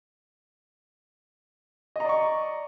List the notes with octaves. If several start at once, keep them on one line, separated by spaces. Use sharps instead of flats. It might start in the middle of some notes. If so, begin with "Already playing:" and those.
D5 D#5 A#5 C#6